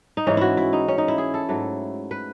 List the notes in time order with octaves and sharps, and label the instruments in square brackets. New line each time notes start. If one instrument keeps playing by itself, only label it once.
[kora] D#4
G#2 E3 G#3 C#4
E4 F#4
E4
D#4
C#4
D#4
E4
G#4
A4
G#2 F#3 A3
B4